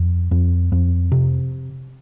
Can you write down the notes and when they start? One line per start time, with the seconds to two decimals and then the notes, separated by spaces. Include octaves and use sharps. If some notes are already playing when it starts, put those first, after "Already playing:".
Already playing: F2
0.31 F2
0.72 F2
1.12 C3